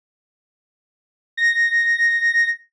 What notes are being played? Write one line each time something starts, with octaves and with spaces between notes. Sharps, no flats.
A#6